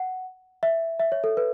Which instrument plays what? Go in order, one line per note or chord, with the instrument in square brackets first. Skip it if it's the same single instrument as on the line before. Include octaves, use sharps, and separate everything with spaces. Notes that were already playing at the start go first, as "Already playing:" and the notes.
Already playing: [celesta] F#5
E5
E5
C#5
A4
B4